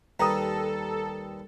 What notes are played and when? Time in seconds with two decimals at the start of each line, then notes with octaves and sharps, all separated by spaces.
0.19 D#2 G3 A4 B4 A#5 D#6